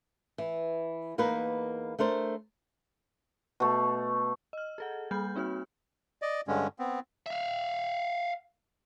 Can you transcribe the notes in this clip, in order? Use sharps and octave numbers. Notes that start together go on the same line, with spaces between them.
E3
E2 A#3 D#4 A#4 B4
A3 D4 A#4 C5
B2 A3
D#5 F6
G#4 A4 F#5
G3 A#3 B5 F6 G6
C4 D#4 F#4 C#5 F6
D5 D#5
G2 D3 G#3 C#4
B3 C4
E5 F5